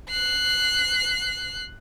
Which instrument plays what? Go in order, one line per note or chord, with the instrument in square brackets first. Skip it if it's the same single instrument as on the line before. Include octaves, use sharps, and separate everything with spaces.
[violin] F#6 C7